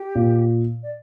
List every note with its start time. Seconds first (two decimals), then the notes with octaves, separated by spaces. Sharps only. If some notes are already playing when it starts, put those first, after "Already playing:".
Already playing: G4
0.15 A#2
0.83 D5